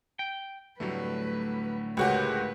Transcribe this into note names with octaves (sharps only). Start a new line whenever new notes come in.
G5
D2 A2 F#3 G3 A3 B4
C#2 G#3 F#4 G4 A#4 B4 C#5